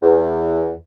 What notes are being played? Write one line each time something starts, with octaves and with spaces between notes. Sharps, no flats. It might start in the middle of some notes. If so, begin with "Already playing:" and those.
E2